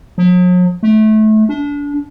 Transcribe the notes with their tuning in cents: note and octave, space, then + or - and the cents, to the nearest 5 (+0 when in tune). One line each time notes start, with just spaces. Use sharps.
F#3 -45
A3 -25
D4 -30